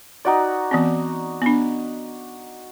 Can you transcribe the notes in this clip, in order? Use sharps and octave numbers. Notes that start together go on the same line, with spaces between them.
D#4 F#4 D5
E3 B3 C4
B3 D4